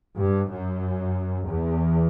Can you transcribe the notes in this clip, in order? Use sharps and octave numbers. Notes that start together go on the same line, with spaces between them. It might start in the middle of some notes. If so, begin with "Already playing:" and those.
G2
F#2
E2